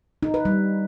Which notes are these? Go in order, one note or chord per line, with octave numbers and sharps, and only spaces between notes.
D#4
B4
G3